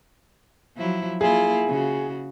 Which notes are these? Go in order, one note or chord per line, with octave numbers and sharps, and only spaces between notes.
F3 F#3 E4
A#3 E4 F4 G#4
C#3 F#4